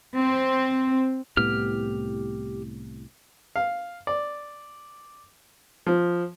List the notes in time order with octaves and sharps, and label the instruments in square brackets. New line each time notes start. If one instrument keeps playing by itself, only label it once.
[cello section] C4
[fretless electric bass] C2 A2 B3 [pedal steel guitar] G4 F6
[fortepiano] F5
D5
F3